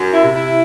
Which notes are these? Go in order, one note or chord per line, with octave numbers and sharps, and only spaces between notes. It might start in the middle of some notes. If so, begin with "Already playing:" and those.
Already playing: F#2
E4
C3
E4